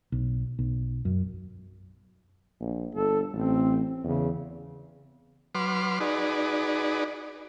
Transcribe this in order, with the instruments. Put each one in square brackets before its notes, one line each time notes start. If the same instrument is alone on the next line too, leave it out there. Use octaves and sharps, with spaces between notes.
[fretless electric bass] B1
B1
F#2
[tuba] A#1
[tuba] G1 [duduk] A4
[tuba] A1 [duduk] C4
[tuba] E2 [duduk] C#3
[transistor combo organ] F#3 B4 C6 D6 F6
D#4 F#4 G#4 B4 D5